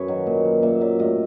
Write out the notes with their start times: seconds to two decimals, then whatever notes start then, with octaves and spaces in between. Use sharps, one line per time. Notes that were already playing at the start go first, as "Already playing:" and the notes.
Already playing: F#2 B4 C#5
0.08 D#3 F#3
0.27 A#2
0.45 F#3
0.62 A#2 D5 E5
0.81 F#3 D5 E5
0.99 A2 D#5 F5